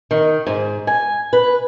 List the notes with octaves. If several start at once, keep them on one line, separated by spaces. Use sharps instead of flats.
D#3
G#2
G#5
B4